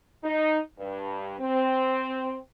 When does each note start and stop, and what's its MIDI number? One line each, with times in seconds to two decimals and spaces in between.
0.24 0.58 63
0.79 1.34 43
1.40 2.36 60